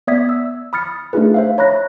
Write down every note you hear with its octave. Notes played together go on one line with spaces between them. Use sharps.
B3 D5 E5 D#6 G#6 B6
E6
B5 D#6 F6 A6 C#7
A3 D4 D#4 F4 G#4 B4
C5 E5 F5
C#5 A#5 B5 F#6 A#6